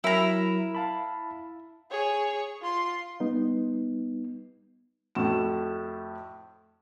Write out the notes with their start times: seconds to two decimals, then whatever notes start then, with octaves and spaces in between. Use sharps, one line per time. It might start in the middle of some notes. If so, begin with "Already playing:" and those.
0.04 F#3 E4 A#4 E5 A#5
0.75 F5 A5 B5
1.91 G#4 C#5
2.61 F4 C6
3.20 G3 B3 D#4
5.15 F2 A2 F#4 E7